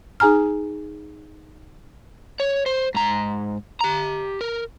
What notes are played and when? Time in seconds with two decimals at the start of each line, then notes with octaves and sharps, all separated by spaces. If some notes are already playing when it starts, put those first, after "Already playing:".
0.20 D#4 G#4 G#5 A#5 F6
2.40 C#5
2.66 C5
2.95 G#2 A#5
3.81 G4 A#5
4.41 A#4